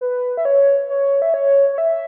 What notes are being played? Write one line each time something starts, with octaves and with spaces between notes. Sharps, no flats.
B4
E5
C#5
C#5
E5
C#5
C#5
E5